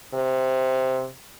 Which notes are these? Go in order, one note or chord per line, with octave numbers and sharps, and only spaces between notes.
C3